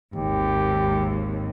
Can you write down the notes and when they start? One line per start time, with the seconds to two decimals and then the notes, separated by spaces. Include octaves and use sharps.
0.16 G#1 D#2 G4